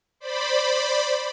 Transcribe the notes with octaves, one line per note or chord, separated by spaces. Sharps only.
C5 D5 B5